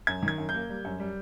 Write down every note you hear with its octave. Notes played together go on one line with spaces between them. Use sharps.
F#2 G#6
D#3
G#6
F#2
G6
A#3
G3
F#2
G3